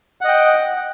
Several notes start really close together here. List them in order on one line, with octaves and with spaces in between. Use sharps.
F#5 D#5 G5